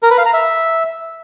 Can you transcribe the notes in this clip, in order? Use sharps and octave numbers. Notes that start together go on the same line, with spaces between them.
A#4
B4
F5
A#5
E5